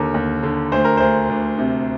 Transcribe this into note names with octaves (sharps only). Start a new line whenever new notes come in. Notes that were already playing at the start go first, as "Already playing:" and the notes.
Already playing: D#2 D3 A#4
D#2
D3
D2 C5
A#4
D2 C5
D2
C3